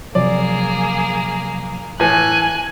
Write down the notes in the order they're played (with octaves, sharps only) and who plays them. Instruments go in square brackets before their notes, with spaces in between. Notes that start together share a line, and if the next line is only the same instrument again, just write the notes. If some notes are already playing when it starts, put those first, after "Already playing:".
[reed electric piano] C3 F3 F#3 [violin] A#3 G#4 [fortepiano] D5
[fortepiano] A2 E3 [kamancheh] G#5 [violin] F#6